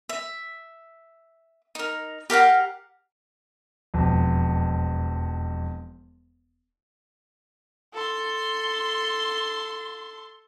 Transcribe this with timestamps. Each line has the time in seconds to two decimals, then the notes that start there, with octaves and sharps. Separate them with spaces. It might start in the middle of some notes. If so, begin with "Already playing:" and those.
0.09 E5
1.75 D#4 A#4
2.30 G4 A#4 F5 F#5
3.94 E1 F2
7.94 A4 C6